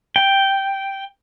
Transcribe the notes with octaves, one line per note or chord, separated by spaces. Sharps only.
G5